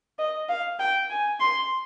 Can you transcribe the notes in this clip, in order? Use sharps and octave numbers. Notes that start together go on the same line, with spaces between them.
D#5
F5
G5
G#5
C6